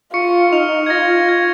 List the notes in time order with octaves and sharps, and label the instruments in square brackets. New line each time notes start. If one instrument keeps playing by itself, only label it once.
[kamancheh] F4 [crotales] C#6 C#7
[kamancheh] D#4 [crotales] F6 F7
[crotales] G#6
[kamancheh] F4 [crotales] A#6
[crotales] G#6